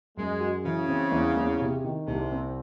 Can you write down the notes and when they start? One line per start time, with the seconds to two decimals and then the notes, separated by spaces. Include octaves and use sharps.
0.17 F#2 G#3
0.40 F#4
0.65 C#3 E3
0.89 C4
1.12 E2
1.37 E2
1.60 C3
1.84 D#3
2.07 C2 C3
2.32 C4